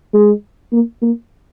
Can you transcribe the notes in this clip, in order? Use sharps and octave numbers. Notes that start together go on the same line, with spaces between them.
G#3
A#3
A#3